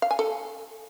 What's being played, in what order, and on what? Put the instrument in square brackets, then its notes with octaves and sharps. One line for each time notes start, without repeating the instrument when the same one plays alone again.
[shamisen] F5
G#5
A4